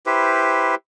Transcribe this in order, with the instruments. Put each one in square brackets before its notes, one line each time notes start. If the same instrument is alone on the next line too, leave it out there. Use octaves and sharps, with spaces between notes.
[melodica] E4 G4 B4 C5